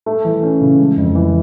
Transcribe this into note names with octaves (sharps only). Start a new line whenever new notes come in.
A3
E3
C#4
C#3
G#3
F2
E3